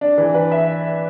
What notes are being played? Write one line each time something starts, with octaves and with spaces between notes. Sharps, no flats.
D4
E3
B4
E5